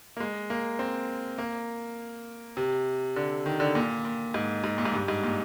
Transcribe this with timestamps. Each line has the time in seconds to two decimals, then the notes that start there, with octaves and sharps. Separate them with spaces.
0.17 A#3
0.20 G#3
0.50 A#3
0.79 C4
1.38 A#3
2.57 C3
3.16 D3
3.46 D#3
3.60 D3
3.75 A#2
4.05 A#2
4.34 G#2
4.64 G#2
4.78 A#2
4.85 G#2
4.94 G2
5.08 G#2
5.24 A#2